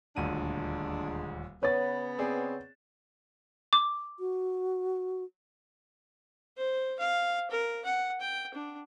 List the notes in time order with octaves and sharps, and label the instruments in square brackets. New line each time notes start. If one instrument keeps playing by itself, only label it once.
[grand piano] D#1 D2 D#7 [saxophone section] A#2 G#3 D4
[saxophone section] C#3 B3 [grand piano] B4 [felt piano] C#5 A6
[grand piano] C4 G#4 D5
[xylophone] D6
[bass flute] F#4
[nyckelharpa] C5
F5
A#4
F#5
G5
D4